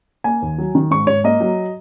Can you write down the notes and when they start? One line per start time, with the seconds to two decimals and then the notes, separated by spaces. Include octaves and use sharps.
0.24 A#3 G#5
0.42 D#2
0.58 F#3
0.75 D#3
0.91 G#2 C#6
1.07 G#2 C#5
1.24 A#3 D#5
1.41 F#3